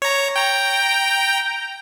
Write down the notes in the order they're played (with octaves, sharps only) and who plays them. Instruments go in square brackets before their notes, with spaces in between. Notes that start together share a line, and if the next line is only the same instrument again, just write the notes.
[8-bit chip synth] C#5 A#5
G5 A#5